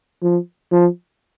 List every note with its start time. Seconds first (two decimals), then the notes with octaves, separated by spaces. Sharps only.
0.22 F3
0.71 F3